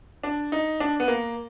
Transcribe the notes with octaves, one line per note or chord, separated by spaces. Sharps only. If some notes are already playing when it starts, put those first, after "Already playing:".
D4
D#4
D4
B3
A#3